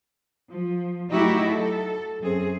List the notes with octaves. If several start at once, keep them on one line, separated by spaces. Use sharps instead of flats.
F3
F#3 A3 D#4 E4 F#4 G4
A4
F#2 C4 G#4